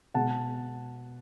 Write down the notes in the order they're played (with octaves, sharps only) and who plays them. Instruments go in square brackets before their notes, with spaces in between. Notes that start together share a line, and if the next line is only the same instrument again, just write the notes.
[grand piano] B2 G#3 F#5 A5